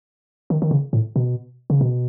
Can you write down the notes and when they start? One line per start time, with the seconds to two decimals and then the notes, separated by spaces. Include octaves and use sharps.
0.50 D#3
0.62 D#3
0.71 C#3
0.93 A2
1.16 B2
1.70 C#3
1.81 B2